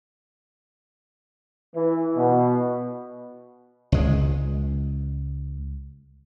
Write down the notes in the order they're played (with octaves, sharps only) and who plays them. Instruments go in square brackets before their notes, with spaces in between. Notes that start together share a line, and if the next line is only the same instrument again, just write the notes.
[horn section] E3
B2
[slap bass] C#2 G#3